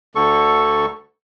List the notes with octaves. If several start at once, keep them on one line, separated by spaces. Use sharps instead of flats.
D2 D3 A4 C#6